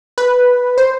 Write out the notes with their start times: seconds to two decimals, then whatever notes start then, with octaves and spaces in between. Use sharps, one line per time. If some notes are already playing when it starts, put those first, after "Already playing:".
0.18 B4
0.78 C5